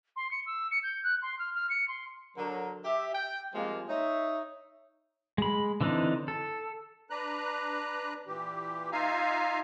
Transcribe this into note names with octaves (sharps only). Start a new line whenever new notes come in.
C6
C#7
E6
C#7
G6
F#6
C6
F6
F6
C#7
C6
D3 F#3 A#4
G4 E5
G5
F3 G3 G#3 A#3 C4 F4
D#4 C#5 E5
G#3 B5
D3 E3 C4 D4 D#4
A4
D4 B4 A#5 F#6
A#2 E3 G4
D#4 F4 E5 F5 G#5 A#5